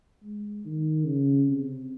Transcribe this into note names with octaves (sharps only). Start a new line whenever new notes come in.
G#3
D#3
C#3
C3